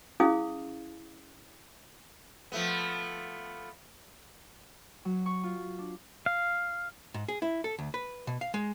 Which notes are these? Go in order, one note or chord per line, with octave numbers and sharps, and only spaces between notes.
C#4 E4 G#4 F5 D#6
F3 A3 B3
F#3
C#6
F4
D4
F5
G#2
G#4
E4
A4
D2
B4
B2
F5
G#3